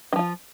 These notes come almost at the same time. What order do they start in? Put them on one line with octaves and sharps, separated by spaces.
D#3 F3 F4